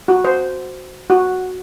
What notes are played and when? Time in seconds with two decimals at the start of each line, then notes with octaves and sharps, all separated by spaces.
0.08 F#4
0.24 C5
1.10 F#4